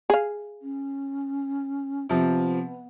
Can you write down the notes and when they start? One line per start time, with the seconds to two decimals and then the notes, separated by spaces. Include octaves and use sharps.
0.10 G#4 F5
0.62 C#4
2.09 C3 F3 B3